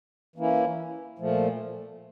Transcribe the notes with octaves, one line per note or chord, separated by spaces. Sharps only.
E3 A#3 C#4 E4
A#2 F3 A3